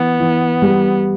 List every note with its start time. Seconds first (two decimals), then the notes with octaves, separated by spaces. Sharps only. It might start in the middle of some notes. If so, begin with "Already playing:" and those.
Already playing: E3 B3
0.20 E3
0.62 G3